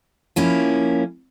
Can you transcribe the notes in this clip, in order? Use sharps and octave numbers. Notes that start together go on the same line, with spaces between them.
F3 A#3 C#4 E4